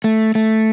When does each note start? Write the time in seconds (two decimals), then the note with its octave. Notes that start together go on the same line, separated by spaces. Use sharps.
0.04 A3
0.35 A3